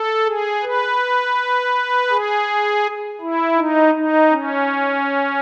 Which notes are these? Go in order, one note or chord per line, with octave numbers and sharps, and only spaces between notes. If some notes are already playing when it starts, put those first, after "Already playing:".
Already playing: A4
G#4
B4
G#4
E4
D#4
D#4
C#4